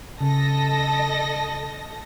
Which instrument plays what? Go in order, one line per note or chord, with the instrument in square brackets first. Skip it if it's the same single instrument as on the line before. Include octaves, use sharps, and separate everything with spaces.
[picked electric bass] C#3 [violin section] A4 D#5 A#6